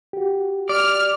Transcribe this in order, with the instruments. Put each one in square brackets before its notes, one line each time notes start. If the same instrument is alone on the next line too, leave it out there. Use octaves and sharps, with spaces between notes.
[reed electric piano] F#4 G4
[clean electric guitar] D5 [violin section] F6